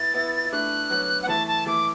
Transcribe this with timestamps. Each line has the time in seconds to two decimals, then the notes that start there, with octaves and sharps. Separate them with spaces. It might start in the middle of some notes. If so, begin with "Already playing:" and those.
Already playing: B3 E4 A6
0.14 B3 E4
0.45 E4
0.52 A3 D4 F#6
0.90 F#3 B3
1.22 B3 F#5
1.28 E3 A3 A5
1.47 A5
1.66 E3 A3 D6